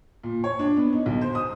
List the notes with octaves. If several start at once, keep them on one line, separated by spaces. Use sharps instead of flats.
A#2
C#5
D4
B3
D#4
B1
C5
D#6